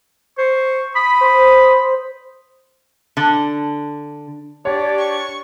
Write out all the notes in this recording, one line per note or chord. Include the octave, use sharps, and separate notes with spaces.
C5 C#6
B5 D#6 B6
C5
D3
D4 G4 C#5 D5
C#6